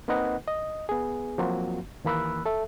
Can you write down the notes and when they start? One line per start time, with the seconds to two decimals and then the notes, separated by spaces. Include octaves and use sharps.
0.08 A#3 C4 D#4 B4 D#5 F#5
0.48 D#5
0.89 B3 G#4
1.38 F3 F#3 A#3 C4 F4 F#4
2.04 D#2 E3 A#3 B5 E6 F#6
2.46 A4 E5